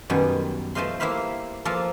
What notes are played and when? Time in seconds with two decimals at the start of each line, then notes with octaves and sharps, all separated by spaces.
0.10 F#2 B2 D#3 G3
0.75 F3 A3 C5 D#5 F5 C6
1.00 A#3 E4 G4 C5 F5 B5
1.65 F3 A#3 A4 D5 F5